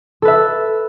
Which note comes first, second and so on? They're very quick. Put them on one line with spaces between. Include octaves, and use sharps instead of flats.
A4 B4 E5